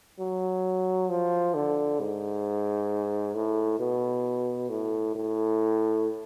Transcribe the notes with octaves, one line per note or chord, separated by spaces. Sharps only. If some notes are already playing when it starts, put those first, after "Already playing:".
F#3
F3
D3
G#2
A2
B2
A2
A2